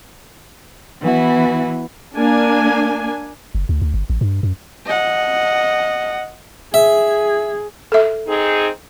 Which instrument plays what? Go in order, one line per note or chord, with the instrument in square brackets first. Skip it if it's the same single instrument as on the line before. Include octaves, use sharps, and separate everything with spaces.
[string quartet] E3 B3 E4 F#4
[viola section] A#3 D4 G#5
[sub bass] F#1
D2
D2
G1
A1
G2
F#2
[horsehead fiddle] D#5 F#5
[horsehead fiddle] G#4 [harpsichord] E5
[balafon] A4 E5
[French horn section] C4 D#4 G#4